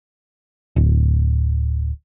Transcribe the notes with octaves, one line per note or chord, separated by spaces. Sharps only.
D1